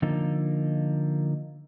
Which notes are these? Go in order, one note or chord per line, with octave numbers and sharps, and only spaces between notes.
D3 F3 A#3 D#4